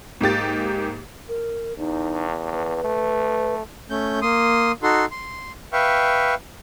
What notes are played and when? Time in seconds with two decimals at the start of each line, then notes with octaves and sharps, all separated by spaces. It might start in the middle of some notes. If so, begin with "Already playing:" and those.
0.21 G#2 A#3 G4 A6
1.28 A#4
1.78 E2 D#4
2.52 B4
2.84 A3
3.90 A3 C#4 G6
4.22 A#3 C6 D#6
4.83 D#4 F#4 A4 C6
5.11 C6
5.73 B4 E5 F5 G5 C#6